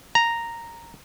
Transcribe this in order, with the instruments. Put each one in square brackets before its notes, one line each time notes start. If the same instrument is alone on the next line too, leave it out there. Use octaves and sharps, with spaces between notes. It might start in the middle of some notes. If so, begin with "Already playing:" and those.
[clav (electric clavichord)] A#5